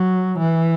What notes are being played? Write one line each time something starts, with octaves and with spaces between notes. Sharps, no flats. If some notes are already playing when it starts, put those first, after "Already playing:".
Already playing: F#3
E3